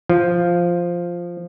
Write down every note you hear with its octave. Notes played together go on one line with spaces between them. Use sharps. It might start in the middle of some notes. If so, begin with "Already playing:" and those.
F3